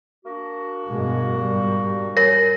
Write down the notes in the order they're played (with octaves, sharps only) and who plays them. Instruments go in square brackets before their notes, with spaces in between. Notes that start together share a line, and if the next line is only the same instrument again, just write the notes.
[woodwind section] A#3 D4 F#4
[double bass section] G2 B2 G#3
G#2 G3
[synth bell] A#4 C#5 [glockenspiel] A#6